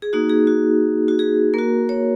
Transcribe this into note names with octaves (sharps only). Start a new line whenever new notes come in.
G#4
A#3 D#4 F#4
G#4
F#4
F#4
G#4
A#3 F#4 A#4
C#5